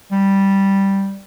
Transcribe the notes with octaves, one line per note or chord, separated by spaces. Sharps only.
G3